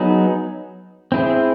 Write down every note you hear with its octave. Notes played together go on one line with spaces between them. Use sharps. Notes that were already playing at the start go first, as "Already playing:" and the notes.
Already playing: F#3 B3 D#4 G#4
C4 E4 G#4